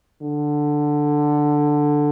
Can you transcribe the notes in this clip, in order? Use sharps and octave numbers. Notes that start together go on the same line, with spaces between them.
D3